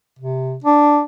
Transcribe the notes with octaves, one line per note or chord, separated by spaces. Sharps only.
C3
D4